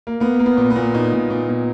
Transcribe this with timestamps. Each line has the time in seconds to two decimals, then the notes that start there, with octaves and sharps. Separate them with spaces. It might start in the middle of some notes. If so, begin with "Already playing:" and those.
0.07 A#3
0.20 A#3 B3
0.39 A#3
0.46 B3
0.57 A#2
0.70 B3
0.76 A#2
0.94 A#2 D#4
1.13 A#2
1.30 A#2
1.49 A#2